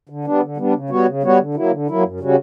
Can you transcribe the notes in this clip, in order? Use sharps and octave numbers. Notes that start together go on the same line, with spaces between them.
D3
G3 B3 D4
D3
G3 B3 D4
C#3
G3 B3 F#4 C#5
C#3
G3 B3 F#4 C#5
D3
F#3 A#3 E4
D3
F#3 A#3 E4
F#2
C#3 G3 C#4 F#4